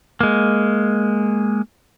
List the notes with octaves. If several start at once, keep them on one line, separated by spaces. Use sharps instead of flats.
G#3 A#3